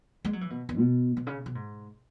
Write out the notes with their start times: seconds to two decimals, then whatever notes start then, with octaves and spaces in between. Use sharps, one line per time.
0.25 G#3
0.33 F#3
0.41 E3
0.50 B2
0.69 E2
0.79 B2
1.17 B2
1.27 C#3
1.46 B2
1.55 G#2